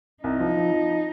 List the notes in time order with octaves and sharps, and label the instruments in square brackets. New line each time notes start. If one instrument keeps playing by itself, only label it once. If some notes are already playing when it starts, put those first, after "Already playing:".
[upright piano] C2 [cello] D#4
[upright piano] F3
F3
F3